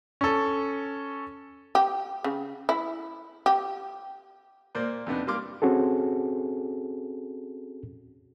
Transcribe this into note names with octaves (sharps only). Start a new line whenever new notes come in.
C#4 A4
G4
C#3
E4
G4
A#2 A#3 C5 D5
F2 C3 B3 D4 D#4
G3 A#3 C6 D6 F6
C4 C#4 F#4 G#4 A4